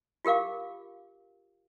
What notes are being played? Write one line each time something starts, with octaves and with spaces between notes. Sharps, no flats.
F4 G4 A#4 F5 D6